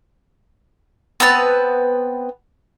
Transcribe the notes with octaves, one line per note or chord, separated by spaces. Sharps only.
B3 C4 B4 A5